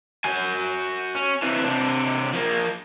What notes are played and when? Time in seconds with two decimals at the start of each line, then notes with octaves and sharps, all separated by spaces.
0.24 F#4 G#5
1.15 C#4
1.42 C3 E3
1.64 C3 D4
2.33 F3 A#3